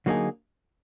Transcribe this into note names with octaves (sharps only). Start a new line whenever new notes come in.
D3 F#3 A#3 D#4 G#4